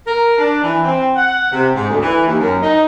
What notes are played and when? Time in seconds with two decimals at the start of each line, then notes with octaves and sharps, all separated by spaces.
0.07 A#4
0.38 D4
0.62 E3
0.83 C4
1.16 F#5
1.51 C3
1.74 G#2
1.90 D2
2.01 E3
2.26 D#2
2.39 F#2
2.62 D#4